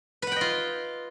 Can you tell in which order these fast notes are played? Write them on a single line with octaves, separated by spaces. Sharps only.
B4 F#5 G5 D#5 F4